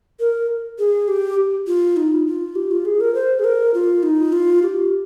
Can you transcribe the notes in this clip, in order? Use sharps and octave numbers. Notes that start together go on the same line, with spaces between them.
A#4
G#4
G4
F4
D#4
F4
G4
F4
G#4
A#4
C5
G#4
A#4
F4
D#4
F4
G4